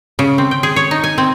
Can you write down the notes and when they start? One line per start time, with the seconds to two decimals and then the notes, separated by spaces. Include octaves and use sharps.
0.19 C#3
0.38 C4
0.51 G5
0.63 G#4
0.76 C#5
0.91 D#4
1.04 G#5
1.18 C4